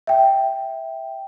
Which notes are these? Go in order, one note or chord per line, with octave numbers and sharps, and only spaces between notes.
E5 G5